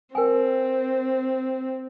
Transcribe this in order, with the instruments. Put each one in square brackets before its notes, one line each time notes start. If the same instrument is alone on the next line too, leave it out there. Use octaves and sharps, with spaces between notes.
[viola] C4 [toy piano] A#4 G5 G#5